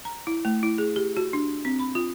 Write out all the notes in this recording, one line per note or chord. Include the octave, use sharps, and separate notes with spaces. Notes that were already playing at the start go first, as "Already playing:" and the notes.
A#5
E4
A3
E4
G#4
G4
F#4
D4
C4
B5
F4